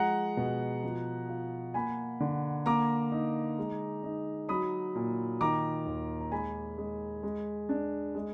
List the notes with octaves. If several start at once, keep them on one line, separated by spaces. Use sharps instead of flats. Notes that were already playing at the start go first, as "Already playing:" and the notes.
Already playing: F3 G#3 F#5 A#5
B2
F3
F4
A#3 G#5 B5
D3
A#3 A#5 D6
D#4
G#3
D#4
F#3 B5 D#6
A#2
D#3 A#5 D6
D#2
A#5
G#3 G#5 B5
G#3
G#3
D4
G#3